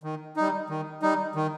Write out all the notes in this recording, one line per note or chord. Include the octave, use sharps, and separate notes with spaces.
D#3
G3 D#4
D#3
G3 D#4
D#3